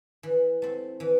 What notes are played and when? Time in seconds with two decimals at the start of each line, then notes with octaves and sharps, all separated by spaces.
0.23 E3
0.62 A3 C4
1.00 E3